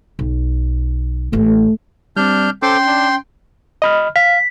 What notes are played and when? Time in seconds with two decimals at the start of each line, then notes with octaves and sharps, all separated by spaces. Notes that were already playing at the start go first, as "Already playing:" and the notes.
0.19 B1
1.33 A1 A3 E4
2.17 G3 C4 D4 F6 G6
2.62 C#4 A4 C5 G5 C6 D6
2.87 D4
3.82 D#5 B5 F6
4.16 F5 B6